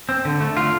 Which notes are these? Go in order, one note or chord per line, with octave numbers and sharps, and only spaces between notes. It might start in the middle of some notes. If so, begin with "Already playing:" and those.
C4
D3
A3
D3 F4